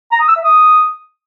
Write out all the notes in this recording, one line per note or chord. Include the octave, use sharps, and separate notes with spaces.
A#5
D#6
E6
E5
D#6